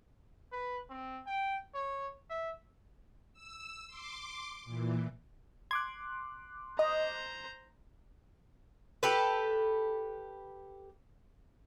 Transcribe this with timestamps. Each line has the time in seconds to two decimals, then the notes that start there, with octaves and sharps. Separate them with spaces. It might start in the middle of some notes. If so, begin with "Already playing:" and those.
0.52 B4
0.90 C4
1.27 G5
1.74 C#5
2.30 E5
3.33 E6
3.87 C6 D6
4.64 A#2 E3
5.71 C6 D6 F#6 G#6
6.79 C5 D#5 A#5
9.03 G4 A4 B4